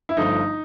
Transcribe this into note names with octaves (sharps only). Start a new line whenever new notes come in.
E4
G1 G2 D3 F3 A3 D#4